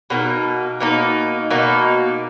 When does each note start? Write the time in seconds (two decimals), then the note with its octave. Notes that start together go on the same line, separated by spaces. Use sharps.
0.10 B2 A#3 D#4
0.80 B2 A#3 D#4
1.50 B2 A#3 D#4